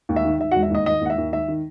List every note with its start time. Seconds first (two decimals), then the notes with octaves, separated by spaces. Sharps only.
0.09 D#2
0.16 E5
0.25 D#3
0.39 D#3 E5
0.51 F#4 F#5
0.55 E1
0.63 E5
0.71 D#2 D#5
0.86 D#3 D#5
1.01 D#2 F#5
1.10 E5
1.18 D#2
1.32 D#3 E5
1.48 D#3